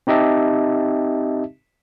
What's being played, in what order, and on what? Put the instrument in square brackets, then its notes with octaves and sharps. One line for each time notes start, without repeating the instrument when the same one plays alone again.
[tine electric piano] C4 D#4 G4 D#5 E5 A5